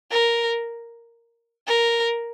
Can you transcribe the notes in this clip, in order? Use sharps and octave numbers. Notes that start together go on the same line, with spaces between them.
A#4
A#4